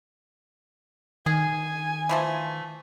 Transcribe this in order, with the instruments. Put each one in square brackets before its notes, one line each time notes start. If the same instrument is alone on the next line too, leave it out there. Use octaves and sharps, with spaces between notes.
[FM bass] D#3 [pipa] G#4 [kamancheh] G#5
[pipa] E3 F3 A3